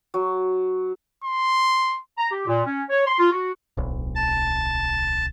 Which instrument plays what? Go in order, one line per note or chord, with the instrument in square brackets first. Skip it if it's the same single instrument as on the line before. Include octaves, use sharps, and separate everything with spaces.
[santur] F#3
[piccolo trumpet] C6
[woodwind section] A#5
G4
A#2
C#4
C#5
C6
F4
F#4
[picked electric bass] D1 B1
[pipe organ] A5